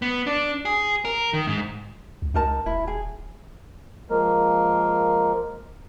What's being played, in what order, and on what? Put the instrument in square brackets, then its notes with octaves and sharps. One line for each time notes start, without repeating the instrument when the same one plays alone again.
[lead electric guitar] B3
D4
G#4
A#4
D#3
G#2
[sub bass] C#2
[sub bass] C#2 [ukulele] D#4 A#4 A5
[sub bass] D#1 [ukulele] E4
[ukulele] G#4
[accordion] F3 G#3 A#3 A#4